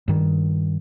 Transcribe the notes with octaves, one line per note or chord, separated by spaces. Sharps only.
G2 D#3